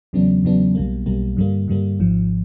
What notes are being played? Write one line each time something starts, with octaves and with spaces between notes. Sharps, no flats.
E2 C#3 F#3 B3 D4
E2 C#3 F#3 B3 D4
B1 B2 G3 A#3
B1 B2 G3 A#3
G2 D3 G3 A#3
G2 D3 G3 A#3
G#1 G#2 F3